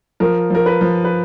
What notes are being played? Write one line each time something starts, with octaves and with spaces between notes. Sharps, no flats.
F3 A#4
F3 A#4
B4
F3
B4